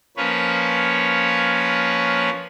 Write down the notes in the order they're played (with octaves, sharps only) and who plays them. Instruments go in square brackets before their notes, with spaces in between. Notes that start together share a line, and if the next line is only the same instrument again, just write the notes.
[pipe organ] F3 A#3 C#4 B4 C#5